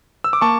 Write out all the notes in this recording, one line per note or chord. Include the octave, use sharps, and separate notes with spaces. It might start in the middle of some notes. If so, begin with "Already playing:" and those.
E6
D6
A#3 A5 C#6